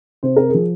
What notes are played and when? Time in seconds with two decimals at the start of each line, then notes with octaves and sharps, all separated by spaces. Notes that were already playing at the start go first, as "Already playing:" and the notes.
0.23 C3 C5
0.37 A#4
0.49 G#4
0.54 F3